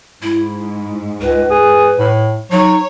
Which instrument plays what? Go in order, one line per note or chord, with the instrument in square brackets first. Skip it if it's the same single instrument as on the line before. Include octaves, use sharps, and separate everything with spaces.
[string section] G#2 [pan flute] E4
[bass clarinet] C#2 [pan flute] B4
[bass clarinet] G#4
A2
[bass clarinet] F#3 [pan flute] D#4 [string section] C#5